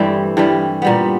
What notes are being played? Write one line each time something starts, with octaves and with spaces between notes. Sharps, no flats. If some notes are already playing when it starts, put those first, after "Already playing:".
Already playing: G2 E3 G3 A3 C4
G2 E3 G3
A#2 G3 B3